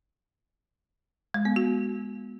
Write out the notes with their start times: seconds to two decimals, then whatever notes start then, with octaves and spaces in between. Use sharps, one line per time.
1.34 G#3
1.45 B3
1.56 F#4